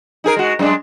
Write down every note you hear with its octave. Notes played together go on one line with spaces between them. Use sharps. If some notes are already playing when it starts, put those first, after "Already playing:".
D#4 G#4 A#4
G#3 F#4
F#2 G#3 D4